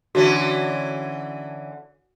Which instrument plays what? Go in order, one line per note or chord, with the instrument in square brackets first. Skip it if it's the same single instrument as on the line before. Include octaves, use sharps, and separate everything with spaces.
[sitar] D3 E3 C#4 [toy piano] F#4